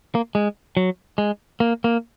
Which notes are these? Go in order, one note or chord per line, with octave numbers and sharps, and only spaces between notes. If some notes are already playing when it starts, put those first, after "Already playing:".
A#3
G#3
F#3
G#3
A#3
A#3